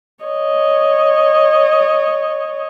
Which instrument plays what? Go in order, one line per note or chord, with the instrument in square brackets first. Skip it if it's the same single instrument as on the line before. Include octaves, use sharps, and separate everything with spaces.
[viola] C#5 D#5